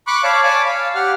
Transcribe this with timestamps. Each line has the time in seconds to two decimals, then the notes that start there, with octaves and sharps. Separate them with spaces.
0.07 B5 C#6 D6 F#6
0.23 C#5 D5 F5 A5 D6
0.44 C#5 G#5 A5 B5 D6
0.65 F5
0.95 G4 F#5 F6